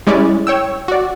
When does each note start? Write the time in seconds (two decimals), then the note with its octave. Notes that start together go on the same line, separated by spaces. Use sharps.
0.07 G3 G#3 C#4 E4 D5
0.47 C#5 G5 E6
0.88 F#4 D5